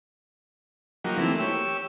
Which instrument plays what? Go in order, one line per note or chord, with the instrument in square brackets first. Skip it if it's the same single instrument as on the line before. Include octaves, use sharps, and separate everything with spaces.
[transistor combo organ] F3 F#3 A#3 D#4 F#4 G4
E3 A3 A#3 C4 E4
G4 C#5 E6